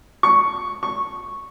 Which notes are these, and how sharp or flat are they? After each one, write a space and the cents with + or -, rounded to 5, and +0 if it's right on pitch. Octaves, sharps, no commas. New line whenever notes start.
C#6 +5
C#6 -5